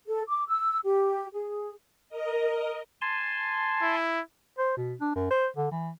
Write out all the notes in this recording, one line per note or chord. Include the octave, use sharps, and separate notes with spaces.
A4
D6
E6
G4
G#4
A#4 D#5
G#5 A5 C6
E4
C5
B2
D4
F#2
C5
D3
E3